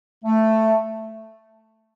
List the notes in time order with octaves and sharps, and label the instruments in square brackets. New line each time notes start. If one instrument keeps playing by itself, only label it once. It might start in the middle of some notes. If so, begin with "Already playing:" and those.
[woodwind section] A3